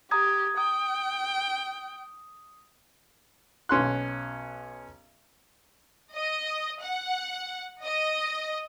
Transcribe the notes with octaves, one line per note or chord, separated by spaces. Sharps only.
G4 A#5 D#6 G#6
G5 D#6
B1 C#4 C6 F#6
D#5
F#5
D#5